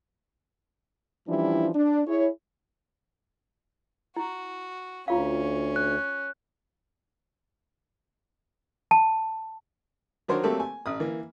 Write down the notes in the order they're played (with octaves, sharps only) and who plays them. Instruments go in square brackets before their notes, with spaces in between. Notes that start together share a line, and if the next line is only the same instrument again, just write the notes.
[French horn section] E3 F3 G3 C#4 D4 E4
D4
E4 G#4 C#5
[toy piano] E4 [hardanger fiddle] F#4
[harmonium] D2 [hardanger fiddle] C#4 [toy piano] E4 F4 F5
[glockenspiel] F#6
[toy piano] A5
[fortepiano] D#3 F#3 D4 A#4 C5 C#5
F#3 A3 A#3 C4 G4 A4
G#5
A1 D#6
E3 A#3